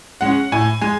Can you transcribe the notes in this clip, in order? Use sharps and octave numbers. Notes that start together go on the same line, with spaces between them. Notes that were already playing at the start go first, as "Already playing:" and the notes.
G#3 C#4 F#5
A2 G#5
G#3 G#5